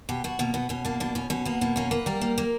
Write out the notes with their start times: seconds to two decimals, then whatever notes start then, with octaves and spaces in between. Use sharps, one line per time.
0.09 B2 G4
0.24 B2 F#4
0.39 B2 A#3
0.54 B2 B3
0.69 B2 C#4
0.85 A#3 D4
1.00 B2 D4
1.15 B2 C#4
1.30 B2 C#4
1.45 A#3 B3
1.61 B2 A#3
1.76 A#3 C#4
1.91 A#3 B4
2.06 G3 A#4
2.21 A#3
2.38 A#3